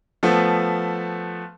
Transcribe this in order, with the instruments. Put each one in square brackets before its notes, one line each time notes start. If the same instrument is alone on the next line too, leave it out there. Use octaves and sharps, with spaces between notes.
[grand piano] F3 A3 B3